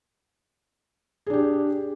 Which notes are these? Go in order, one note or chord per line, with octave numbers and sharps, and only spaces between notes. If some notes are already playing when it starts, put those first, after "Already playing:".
D4 G4 G#4